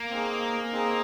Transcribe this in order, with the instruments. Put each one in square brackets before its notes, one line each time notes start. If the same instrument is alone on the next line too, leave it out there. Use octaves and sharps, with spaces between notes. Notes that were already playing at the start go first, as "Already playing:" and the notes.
Already playing: [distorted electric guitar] A#3
[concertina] C4 D#4 G#4
C4 D#4 G#4